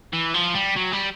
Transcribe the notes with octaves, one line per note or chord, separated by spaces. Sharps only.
E3
F3
G3
F#3
G3